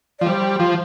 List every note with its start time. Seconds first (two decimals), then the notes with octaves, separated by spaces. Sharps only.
0.19 F3 D5
0.26 G3 C5
0.59 F3